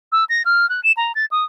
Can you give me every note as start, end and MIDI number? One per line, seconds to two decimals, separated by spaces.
0.12 0.24 88
0.29 0.43 94
0.45 0.69 89
0.69 0.81 90
0.84 0.92 100
0.97 1.12 82
1.15 1.25 93
1.31 1.44 87